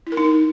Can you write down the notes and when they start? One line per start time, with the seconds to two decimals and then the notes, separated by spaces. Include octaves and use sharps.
0.07 E4
0.12 A#4
0.17 D#4